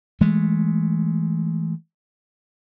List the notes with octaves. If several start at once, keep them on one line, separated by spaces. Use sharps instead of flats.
E3 G#3 A3